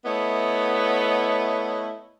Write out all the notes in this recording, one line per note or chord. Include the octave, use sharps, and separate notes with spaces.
A3 B3 E4 C#5 D#5